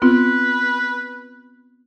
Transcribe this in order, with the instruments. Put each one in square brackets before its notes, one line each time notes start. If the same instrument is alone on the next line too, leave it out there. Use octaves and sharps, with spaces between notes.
[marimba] B3 C4 F4 [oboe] B4